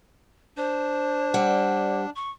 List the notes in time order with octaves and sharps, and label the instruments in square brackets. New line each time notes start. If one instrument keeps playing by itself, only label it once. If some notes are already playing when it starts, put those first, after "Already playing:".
[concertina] D4 [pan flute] C5
[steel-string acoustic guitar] G3 F#5
[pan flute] C#6